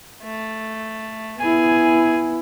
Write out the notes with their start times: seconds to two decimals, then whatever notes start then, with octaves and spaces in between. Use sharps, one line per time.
0.23 A3
1.40 B3 E4 G#4 G#5